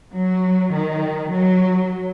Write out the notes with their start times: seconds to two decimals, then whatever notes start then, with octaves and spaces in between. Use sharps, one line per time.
0.14 F#3
0.74 D#3
1.32 F#3